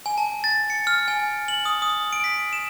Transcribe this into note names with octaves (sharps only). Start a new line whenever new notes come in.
G#5
A5
A6
C#7
F6
G#5
F#7
D#6
D#6
D7
B6
E7